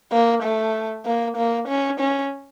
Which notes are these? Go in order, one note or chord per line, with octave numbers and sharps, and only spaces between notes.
A#3
A3
A#3
A#3
C#4
C#4